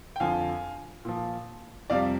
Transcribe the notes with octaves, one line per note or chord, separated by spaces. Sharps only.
G5
F2 D3 F3 F5 G#5
A#2 F3
F2 C3 G3 D5 F5